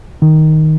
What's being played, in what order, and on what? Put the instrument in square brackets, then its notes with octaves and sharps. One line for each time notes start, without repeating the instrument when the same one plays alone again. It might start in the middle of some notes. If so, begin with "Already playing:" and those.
[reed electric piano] D#3